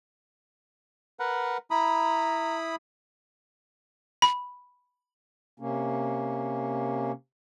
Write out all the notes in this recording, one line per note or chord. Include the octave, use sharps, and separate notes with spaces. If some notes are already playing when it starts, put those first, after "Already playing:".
A#4 B4 F#5
E4 A#5 B5 D#6
B5
C3 A#3 C#4